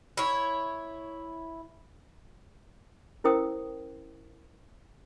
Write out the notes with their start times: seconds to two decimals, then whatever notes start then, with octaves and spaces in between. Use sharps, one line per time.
0.17 E4 C#5
3.24 C#4 E4 A#4 C5 G5 D#6